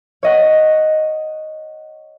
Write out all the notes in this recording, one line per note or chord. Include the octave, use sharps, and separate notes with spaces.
C#5 D#5 F#5